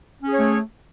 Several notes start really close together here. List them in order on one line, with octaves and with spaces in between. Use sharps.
C#4 G#4 C#5 A3